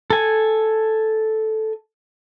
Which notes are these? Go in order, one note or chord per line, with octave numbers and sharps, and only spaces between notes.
A4 G#5